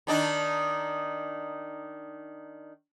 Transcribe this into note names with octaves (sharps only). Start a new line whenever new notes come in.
D#3 D4 D#4